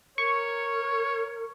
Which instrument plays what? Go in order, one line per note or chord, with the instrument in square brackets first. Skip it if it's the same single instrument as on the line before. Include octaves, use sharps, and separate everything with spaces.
[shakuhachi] A#4 [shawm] C#5 [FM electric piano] C#6